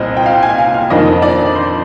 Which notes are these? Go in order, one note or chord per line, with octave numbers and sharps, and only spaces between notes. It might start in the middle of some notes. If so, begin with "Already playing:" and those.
Already playing: C2 A#2 C4 D#5
G5
F5
G#5
F5
F5
F2 D#3 A#3 D4 D#5
D5
C5